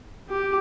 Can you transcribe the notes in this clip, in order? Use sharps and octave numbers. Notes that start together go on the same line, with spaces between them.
G4